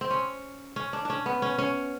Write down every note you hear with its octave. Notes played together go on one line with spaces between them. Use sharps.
C4
C#4
C#4
D4
C#4 D4
B3
C#4
C#4